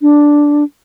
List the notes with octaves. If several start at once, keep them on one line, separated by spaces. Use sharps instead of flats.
D4